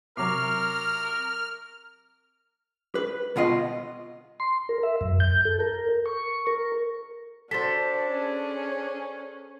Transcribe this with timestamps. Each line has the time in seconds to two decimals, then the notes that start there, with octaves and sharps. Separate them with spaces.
0.17 C3 F#3 A#4 C#6 D6 F6 C7
2.95 B4
3.36 C2 B2 F4 D#5
4.40 C6
4.69 A#4
4.83 E5
5.01 F#2
5.20 G6
5.45 A4
5.60 A#4
6.06 C#6
6.47 A#4
7.51 D4 F#4 A4 C5 A6 B6
8.08 C#4 G#4